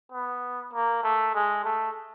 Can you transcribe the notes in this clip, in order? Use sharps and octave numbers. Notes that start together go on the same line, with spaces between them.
B3
A#3
A3
G#3
A3